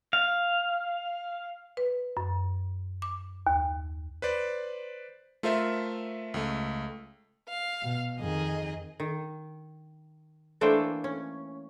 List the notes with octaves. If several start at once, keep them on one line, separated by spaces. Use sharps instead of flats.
F5
B4
F#2
D6
D#2
B4 C5 D5
A3 F4 A4 A#4 C5 E5
C#2 A3
F5
B2
F2 D#3 G#4 D#5
D#3
E3 A3 A#3 D4 C5 G5
C#4